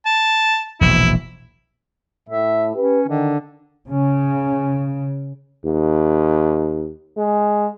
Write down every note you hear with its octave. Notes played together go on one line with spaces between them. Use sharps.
A5
E1 A#1 E4
A2 E5
C#4 G4 B4
D3 D#3
C#3 C#4
D#2
G#3